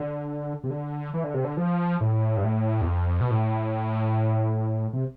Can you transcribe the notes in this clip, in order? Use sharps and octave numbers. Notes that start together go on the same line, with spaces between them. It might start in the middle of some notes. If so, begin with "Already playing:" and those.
Already playing: D3
C3
D3
E3
D3
C3
D3
F3
A2
G2
A2
E2
F2
B2
A2
C3